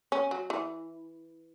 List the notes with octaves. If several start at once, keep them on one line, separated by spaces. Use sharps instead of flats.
C#4
F#3
E3